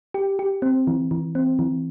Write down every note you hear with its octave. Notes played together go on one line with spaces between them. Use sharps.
G4
G4
C4
E3
E3
C4
E3